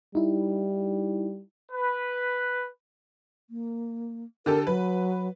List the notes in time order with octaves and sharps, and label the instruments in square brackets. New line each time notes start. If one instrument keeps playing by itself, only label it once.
[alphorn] G3 [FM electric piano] D#4 E4
[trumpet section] B4
[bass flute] A#3
[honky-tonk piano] D3 G4 A4 [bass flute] A#4
[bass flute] F#3 [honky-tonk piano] B4